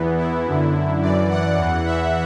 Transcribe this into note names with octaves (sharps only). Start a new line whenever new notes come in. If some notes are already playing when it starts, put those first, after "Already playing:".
Already playing: E2 E3 B3
E4
F#2 D3
F#2 E3 D5
F#5
E2 E3
E5